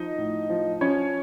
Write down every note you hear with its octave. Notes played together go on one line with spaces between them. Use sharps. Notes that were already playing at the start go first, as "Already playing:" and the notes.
Already playing: F3 D#4 D#5
A2
F3
F3 C#4 C#5